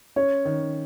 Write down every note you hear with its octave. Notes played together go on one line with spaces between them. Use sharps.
C#4 C#5
D#3